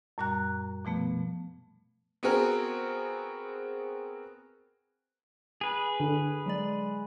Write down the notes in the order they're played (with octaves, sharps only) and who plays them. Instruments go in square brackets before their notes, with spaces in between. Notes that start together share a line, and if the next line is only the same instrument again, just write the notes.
[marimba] F#2 A#2 G3 A#5 F#6
B2 F3 A3 B3
[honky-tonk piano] B3 C4 F#4 G#4 A#4
[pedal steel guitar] G#4 B4
[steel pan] D3
[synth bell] F#3 G#3 D5